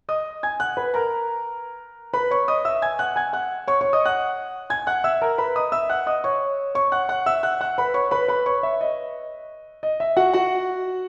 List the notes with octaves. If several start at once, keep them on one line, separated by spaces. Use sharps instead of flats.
D#5 D#6
G#5 G#6
F#5 F#6
B4 B5
A#4 A#5
B4 B5
C#5 C#6
D#5 D#6
E5 E6
G#5 G#6
F#5 F#6
G#5 G#6
F#5 F#6
C#5 C#6
C#5 C#6
D#5 D#6
F#5 F#6
G#5 G#6
F#5 F#6
E5 E6
A#4 A#5
B4 B5
D#5 D#6
E5 E6
F#5 F#6
D#5 D#6
C#5 C#6
C#5 C#6
F#5 F#6
F#5 F#6
E5 E6
F#5 F#6
F#5 F#6
B4 B5
C#5 C#6
B4 B5
B4 B5
C#5 C#6
E5
D#5
D#5
E5
F#4 F#5
F#4 F#5